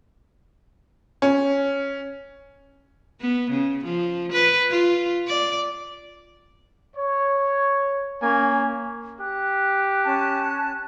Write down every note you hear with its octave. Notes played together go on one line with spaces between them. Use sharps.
C#4
B3
C#3
F3
B4
F4
D5
C#5
A#3 C#4 G#5
G4 F#6
C#4 A5